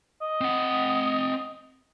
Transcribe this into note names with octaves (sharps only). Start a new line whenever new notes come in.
D#5
C4 F#5